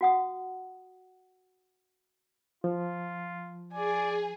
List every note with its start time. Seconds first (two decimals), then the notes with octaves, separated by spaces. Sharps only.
0.01 F#4 F#5 D#6
2.64 F3 F4
3.73 G#4 D5 G#5